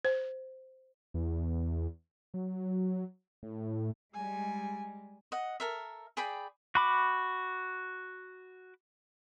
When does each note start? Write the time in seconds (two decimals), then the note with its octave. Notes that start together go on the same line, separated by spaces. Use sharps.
0.05 C5
1.14 E2
2.34 F#3
3.43 A2
4.13 G3 G#3 G#5
5.32 D#5 F#5
5.60 A4 A#4 E5
6.17 G#4 D5 G5 B5
6.75 F#4 B5 D6